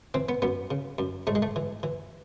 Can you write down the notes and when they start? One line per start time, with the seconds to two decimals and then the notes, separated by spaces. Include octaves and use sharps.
0.14 E3 C4
0.29 B3
0.42 F#2 B3
0.71 C#3
0.99 F#2
1.27 G#2 A3
1.35 G#3
1.42 A3
1.56 E3
1.83 E3